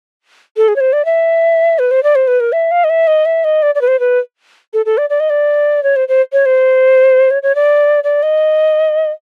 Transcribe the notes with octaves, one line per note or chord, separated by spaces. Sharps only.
A4
G#4
C#5
C5
D5
E5
B4
C5
D5
C5
B4
A#4
E5
F5
D#5
E5
D#5
E5
D#5
D5
D5
B4
C5
B4
A4
A4
D5
D5
D#5
D5
C#5
C5
C5
C#5
C5
C#5
C#5
D5
D5
D#5